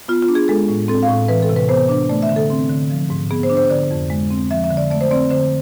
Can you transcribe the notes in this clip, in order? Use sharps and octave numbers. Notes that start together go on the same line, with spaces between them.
B3 F4
F4
D4
G#4
G#3 A4
A2
C4 A4
F5
A2
E3 B4
A4
C3
B4
B3 C5
D4
A3 D5
E5
D3
A4
C4
D3
F3
G#2
B3 G#4
C5
D4
C5
D3 D5
F2
G#3
C4
F3 E5
E5
D3
D5
A3 D5
C5
C4 D5
D3 C5